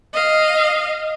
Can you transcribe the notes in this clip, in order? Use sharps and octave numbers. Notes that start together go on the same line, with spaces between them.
D#5 F5